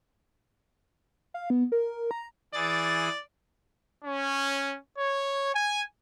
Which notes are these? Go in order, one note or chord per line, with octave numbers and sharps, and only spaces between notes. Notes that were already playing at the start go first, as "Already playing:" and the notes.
F5
B3
A#4
A#5
E3 G#4 D5 A6
C#4
C#5
G#5